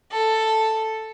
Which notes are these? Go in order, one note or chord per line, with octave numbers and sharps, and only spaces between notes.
A4